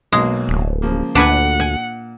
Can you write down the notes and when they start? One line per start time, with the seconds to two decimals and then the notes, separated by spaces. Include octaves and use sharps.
0.12 B1 F#3 G#3 A#3
0.49 D1
0.82 C#3 F3 A#3
1.15 D2 A#2 D4 B4 F#5 G#5
1.60 G#5